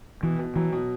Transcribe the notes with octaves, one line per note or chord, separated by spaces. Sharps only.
B2 E3
B2
E3 F#3
B2